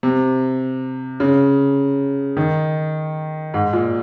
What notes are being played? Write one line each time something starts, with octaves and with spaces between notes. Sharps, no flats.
C3
C#3
D#3
G#2
A#2